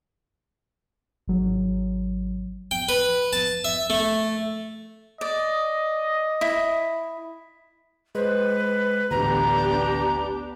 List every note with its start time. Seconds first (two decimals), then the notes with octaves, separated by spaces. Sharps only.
1.27 G#1 F#3
2.71 G5
2.89 B4
3.33 A5
3.64 E5
3.90 A3
5.21 D5 D#5
6.41 E4
8.15 G#3 B4 C5
9.11 A1 D2 B3 D4 G4 A#5